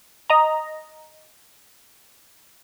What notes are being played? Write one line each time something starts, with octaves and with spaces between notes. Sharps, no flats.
D#5 A#5